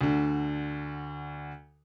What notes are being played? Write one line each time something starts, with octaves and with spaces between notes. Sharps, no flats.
D2 D3